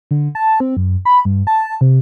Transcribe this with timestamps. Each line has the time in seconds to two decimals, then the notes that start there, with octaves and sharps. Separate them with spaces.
0.11 D3
0.35 A5
0.60 C4
0.77 F#2
1.05 B5
1.25 G2
1.47 A5
1.81 C3